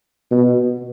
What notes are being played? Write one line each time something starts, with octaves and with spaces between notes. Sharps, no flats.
B2